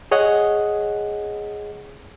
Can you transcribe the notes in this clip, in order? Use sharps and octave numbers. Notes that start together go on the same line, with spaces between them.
G#4 C#5 D#5 F#5